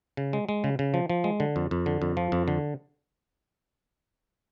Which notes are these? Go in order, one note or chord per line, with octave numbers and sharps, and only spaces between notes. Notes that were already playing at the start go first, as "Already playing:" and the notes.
C#3
G#3
G#3
C#3
C#3
F3
F3
G#3
D3
F2
F2
D3
F2
F3
F2
D3